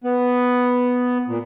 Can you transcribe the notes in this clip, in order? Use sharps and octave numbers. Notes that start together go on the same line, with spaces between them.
B3
A#2